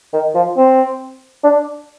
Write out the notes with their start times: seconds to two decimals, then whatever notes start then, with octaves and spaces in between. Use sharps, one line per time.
0.13 D#3
0.35 F3
0.57 C4
1.44 D4